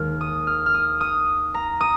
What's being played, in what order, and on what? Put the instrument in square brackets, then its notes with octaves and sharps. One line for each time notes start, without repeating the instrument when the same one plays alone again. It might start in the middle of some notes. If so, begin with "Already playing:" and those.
Already playing: [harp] D#2 D#3 G#3 F6
D#6
F6
F6
D#6
D#6
A#5
D#6